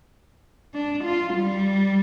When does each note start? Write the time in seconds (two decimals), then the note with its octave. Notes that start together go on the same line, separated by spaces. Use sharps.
0.75 D4
1.04 F4
1.35 G3